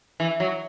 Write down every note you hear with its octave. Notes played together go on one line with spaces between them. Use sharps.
E3
F#3